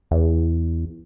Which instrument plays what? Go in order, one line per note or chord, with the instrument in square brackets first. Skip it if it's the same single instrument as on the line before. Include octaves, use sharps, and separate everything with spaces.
[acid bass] E2